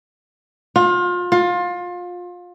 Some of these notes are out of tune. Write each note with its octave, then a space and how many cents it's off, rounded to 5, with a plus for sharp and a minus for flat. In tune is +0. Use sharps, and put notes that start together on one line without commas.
F4 +30
F4 +25